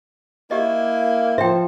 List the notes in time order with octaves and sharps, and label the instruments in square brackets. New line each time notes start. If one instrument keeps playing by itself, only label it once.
[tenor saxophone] A#3 [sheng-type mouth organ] E4 [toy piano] G4 D#5
[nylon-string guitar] F3 C5 [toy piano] E5 G5